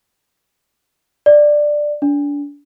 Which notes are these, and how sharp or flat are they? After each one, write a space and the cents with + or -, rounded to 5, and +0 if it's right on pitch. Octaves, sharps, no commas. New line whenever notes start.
D5 +10
D4 -30